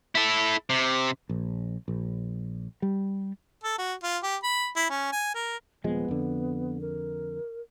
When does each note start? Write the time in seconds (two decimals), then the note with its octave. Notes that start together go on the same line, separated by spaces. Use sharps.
0.15 E4 A4
0.70 C3
1.29 A#1
1.88 A#1
2.82 G3
3.64 A4
3.78 F#4
4.03 F4
4.23 G4
4.43 B5
4.76 E4
4.90 C#4
5.12 G#5
5.35 A#4
5.84 D#1 F3 G#3 B3
6.08 F2 D3
6.81 A#4